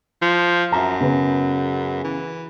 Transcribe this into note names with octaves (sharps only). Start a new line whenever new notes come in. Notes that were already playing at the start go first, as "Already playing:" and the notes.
F3
F#2 E5 A5 A#5
C#3 B3
E3